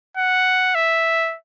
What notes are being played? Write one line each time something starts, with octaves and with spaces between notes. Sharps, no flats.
F#5
E5